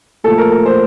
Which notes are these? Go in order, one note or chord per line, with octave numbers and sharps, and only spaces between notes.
A#2 F3 A3 A4
A#4
A#4
C5